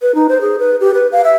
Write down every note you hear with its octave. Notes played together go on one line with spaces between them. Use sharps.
B4
D#4
C5
G#4
B4
G4
B4
F5
E5